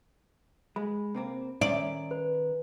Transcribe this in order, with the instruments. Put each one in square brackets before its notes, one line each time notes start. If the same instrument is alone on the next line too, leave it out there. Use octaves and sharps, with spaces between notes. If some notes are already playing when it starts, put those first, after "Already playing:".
[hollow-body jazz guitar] G#3 [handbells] B5
[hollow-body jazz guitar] C3 A#3 C4
[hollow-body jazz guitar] D#3 C#4 [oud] D5
[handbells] B4